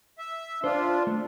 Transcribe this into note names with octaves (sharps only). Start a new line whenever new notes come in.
E5
D4 F4 C5
A3